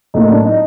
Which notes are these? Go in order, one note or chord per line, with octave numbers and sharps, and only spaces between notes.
A2 F#3 A#3 D#4 D#5
D4 D5
D#4 D#5